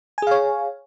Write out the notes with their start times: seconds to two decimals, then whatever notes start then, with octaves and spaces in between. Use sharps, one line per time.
0.18 G#5
0.22 G#4
0.27 F5
0.31 C#5